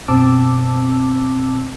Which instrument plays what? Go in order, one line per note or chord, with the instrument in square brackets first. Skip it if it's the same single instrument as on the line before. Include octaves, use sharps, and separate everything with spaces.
[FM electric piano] F#2 B2 C4 A5 D6 E6